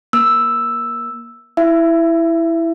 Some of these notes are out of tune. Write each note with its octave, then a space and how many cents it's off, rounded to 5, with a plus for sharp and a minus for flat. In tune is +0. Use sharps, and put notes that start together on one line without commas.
A#3 +25 E6 +0
E4 +0 E5 +25